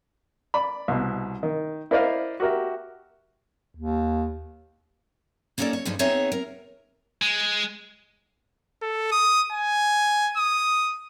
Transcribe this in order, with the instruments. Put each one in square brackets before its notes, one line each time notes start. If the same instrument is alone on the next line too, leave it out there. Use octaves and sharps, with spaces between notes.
[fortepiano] D5 B5
C2 B2
D#3
E4 A#4 C5 D5 D#5 F5
F#4 G4 A#4 E5
[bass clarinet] D#2
[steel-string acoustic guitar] A#3 B3 C#4 D#4 A4 D5
C#5
G2 A#2 F3 G#3 D#4
B3 C4 D#4 G#4 C#5 E5
A#4
[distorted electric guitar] G#3
[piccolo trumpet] A4
D#6
G#5
D#6